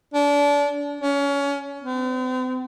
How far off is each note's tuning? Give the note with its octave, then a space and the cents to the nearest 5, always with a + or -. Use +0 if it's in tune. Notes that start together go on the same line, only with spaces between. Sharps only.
D4 -30
C#4 +25
C4 -45